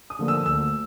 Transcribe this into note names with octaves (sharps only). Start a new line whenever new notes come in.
D#6
D3 F3 A#3 D4
E6
D2 E6